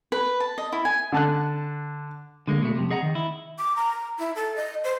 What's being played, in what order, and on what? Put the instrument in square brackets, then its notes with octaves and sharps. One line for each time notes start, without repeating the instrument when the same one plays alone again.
[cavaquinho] B4
A5
D#5
E4
G#5
[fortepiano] D3 A5 F#6
[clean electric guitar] D3 G#3 A#3
B2 A3
F2 C3
G#4 D#5 F#5 A#5
D#3
E4
[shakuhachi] D6
A#5
E4
A4
D#5
C5